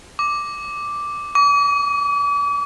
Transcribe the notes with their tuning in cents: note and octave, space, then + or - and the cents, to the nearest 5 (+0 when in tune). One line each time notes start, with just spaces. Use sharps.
D6 +0
D6 -40